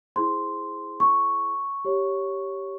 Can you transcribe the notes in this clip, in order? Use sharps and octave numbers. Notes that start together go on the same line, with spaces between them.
E4 G#4 C5 C6
C#6
G4 C#5